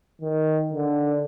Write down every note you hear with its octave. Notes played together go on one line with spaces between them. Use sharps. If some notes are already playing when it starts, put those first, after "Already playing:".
D#3
D3